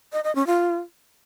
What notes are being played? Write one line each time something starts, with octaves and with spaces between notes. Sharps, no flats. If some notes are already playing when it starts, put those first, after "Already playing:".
D#5
D#5
C#4
F4